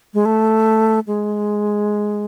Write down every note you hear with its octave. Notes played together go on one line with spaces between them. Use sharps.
G#3
A3
G#3